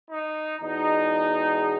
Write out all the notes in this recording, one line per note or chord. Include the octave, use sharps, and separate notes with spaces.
D#4
E2 B2 G#3 D#4